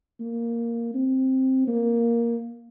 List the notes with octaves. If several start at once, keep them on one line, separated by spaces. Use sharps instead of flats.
A#3
C4
A#3